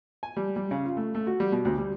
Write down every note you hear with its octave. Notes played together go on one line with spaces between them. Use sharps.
G#5
G3
G3
C#3
F4
A3
A3
F#4
G3
B2
D2
G3